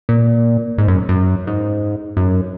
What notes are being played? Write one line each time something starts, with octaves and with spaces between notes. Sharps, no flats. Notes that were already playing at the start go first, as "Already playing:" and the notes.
A#2
G#2
F#2
F#2
G#2
F#2